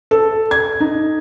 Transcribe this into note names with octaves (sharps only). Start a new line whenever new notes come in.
A4
G#6
D#4